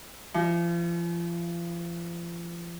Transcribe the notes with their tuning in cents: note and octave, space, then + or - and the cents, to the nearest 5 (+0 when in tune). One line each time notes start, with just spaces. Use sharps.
F3 -35